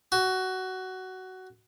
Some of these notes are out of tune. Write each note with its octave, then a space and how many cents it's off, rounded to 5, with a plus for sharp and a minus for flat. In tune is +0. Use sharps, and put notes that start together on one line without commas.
F#4 +15